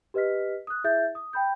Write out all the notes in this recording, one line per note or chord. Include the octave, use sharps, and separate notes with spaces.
G4 B4 D#5 F6 B6
D#6 F#6
E4 G#4 E5 G6 A6
D#6
G5 B5 G6